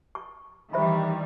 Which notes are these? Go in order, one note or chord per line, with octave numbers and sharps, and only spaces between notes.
C#6
D#3 E3 G3 C5 E5 B5